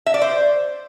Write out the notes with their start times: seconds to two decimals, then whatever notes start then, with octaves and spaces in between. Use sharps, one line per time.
0.06 E5
0.14 D5
0.22 C5